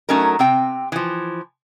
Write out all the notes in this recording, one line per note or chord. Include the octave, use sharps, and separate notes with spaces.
F#3 A3 C#4 D#4 A#4
C3 C4 G5
E3 F3